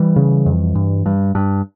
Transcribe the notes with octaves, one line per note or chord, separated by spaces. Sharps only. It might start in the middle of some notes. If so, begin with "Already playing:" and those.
Already playing: E3 G3
C#3
F2
G2
G2
G2